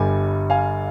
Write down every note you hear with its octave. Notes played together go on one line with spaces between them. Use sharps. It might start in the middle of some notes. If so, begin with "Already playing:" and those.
Already playing: G1 G2 G3 G#5
F5 G#5